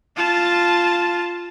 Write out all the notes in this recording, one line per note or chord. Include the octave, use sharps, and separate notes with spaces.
F4 A5